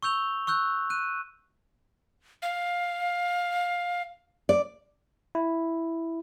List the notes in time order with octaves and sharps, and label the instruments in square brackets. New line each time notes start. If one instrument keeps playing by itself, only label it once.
[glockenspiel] C#6 E6 G6 F7 G7
C#6 E6 F#6 G6
F#6 D#7
[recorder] F5
[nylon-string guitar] D5
[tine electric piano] E4